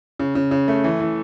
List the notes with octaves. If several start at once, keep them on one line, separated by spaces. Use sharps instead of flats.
C#3
C#3
C#3
A3
E3
E3